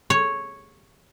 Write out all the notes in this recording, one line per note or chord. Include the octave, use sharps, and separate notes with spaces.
C#5